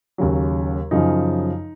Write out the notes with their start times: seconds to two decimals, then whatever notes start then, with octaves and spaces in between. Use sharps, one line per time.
0.18 D#2 C#3 F#3
0.91 F#2 C#3 F3 D#4